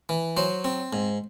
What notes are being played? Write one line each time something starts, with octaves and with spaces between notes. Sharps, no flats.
E3
F#3 C5
C4
G#2